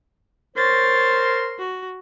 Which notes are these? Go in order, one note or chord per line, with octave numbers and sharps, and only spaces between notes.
A#4 C5 C#5 C6 A6
F#4